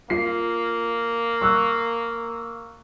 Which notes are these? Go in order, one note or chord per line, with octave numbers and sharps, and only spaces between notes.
A#3 F4 C7
C#6 E6 F#6